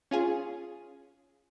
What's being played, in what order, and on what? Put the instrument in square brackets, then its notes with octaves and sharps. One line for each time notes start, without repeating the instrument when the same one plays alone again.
[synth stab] C#4 F4 G#4